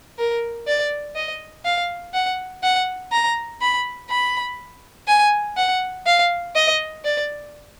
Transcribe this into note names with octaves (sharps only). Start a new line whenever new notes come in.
A#4
D5
D#5
F5
F#5
F#5
A#5
B5
B5
G#5
F#5
F5
D#5
D5